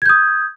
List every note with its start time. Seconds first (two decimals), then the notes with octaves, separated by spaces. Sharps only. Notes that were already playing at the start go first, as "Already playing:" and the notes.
0.02 G#6
0.06 G6
0.09 D#6